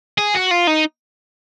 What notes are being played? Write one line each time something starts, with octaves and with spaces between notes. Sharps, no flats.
G#4
F#4
F4
D#4